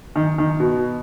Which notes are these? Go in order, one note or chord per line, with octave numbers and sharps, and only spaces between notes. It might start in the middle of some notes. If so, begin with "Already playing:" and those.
D#3
D#3
B2